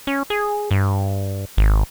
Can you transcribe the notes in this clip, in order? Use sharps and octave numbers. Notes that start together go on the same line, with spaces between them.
C#4
G#4
G2
G#1